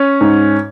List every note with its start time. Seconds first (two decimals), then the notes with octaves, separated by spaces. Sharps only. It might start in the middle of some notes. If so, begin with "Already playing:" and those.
Already playing: C#4
0.21 G#2